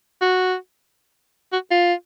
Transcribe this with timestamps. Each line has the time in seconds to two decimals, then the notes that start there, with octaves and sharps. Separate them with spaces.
0.21 F#4
1.52 F#4
1.71 F4